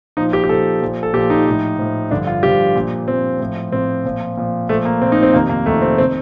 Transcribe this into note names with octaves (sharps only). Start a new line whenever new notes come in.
A#2 F3 D#4
G4
G4
A#2 F3 A4
A#2 F3
A4
A#2 F3 G4
D#4
A2 F3
A2 F3
G2 D3 F3 D4
F4
G2 D3 F3 G4
A#2 F3
A#2 F3 C4
A2 F3
A2 F3 C4
A#2 F3
A#2 F3
A#2 F3 A3
A#3
A#2 F3 C4
D#4
C4
F2 C3 D#3 A#3
A#3
F2 C3 D#3 A3
C4
C4
D#3